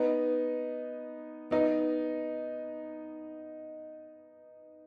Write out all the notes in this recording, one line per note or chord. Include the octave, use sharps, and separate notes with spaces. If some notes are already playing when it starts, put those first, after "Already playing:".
Already playing: B3 D#4
B3 D#4